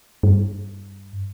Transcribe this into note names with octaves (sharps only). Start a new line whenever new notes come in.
G2